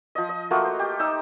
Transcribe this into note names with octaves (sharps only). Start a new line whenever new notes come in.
F3 D#5
D#5
A3 A#3 F4 F#4
C5
G4
D#4 E6